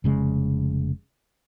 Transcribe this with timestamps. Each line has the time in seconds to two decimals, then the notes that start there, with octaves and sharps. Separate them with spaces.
0.04 F1 C#3 G#3